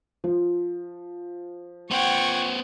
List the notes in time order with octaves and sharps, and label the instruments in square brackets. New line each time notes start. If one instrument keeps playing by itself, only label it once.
[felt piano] F3
[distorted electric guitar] B3 C5 [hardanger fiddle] F#5 G5 [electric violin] C#6 G#6